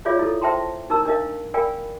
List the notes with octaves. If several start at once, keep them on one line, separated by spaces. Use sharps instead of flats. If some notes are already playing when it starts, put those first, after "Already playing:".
F4 G#4 C#5 D5 E5 F5
E4 A4
C5 E5 G5 A5 A#5 C6
D#4 A#4 A5 A#5 E6
D4 A#4 D#5 F5
A#4 D5 F5 G5 G#5 B5